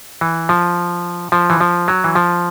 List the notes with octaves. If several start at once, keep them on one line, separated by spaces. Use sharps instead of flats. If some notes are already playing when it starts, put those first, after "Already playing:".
E3
F3
F3
E3
F3
F#3
E3
F3